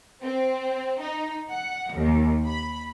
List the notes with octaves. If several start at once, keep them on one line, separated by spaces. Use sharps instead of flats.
C4
D#4
F#5
D#2
B5